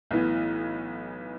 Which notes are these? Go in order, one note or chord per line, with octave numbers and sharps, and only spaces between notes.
B1 A2 E3 B3